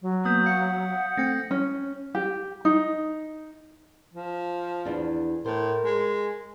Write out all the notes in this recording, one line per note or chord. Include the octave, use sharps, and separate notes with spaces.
F#3
A#3 B3 D#6 G6 B6
F5 F#5 D#6 C#7
A3 C4 G5 G#6 A#6 C#7
C#4
G4
D#4
F3
E2 D4
A2 A#4 C5
G#3